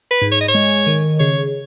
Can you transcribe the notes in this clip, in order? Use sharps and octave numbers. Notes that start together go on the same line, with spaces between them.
B4
G#2
C#5
D#5
C#5
G#3
D#3
C#3 C#5